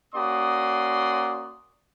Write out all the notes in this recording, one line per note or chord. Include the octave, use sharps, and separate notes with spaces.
A#3 C#4 F#4 D5 C6 D#6